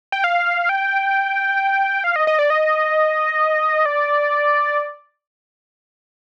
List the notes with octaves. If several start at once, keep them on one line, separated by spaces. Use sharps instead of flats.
G5
F5
G5
F5
D#5
D#5
D5
D#5
D5